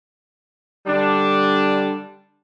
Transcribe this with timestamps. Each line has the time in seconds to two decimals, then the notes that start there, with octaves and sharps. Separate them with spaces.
0.86 D3 G3 D4